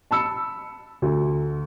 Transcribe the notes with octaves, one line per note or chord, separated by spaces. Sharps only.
A5 B5 E6 C#7
D2